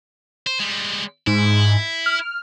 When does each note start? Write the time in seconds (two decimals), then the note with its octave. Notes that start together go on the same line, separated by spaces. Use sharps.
0.47 C5
0.60 G3 G#3
1.27 G#2 E4
2.06 F6